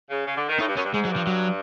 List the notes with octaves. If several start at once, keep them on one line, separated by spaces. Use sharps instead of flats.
C#3
C#3
D3
D#3
A2 D#4
G2
F#2 C#4
G2
G#2 G#3
F#3
G2
F3
F#3